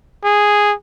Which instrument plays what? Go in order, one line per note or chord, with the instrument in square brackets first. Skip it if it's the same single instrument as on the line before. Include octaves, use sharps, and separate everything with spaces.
[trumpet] G#4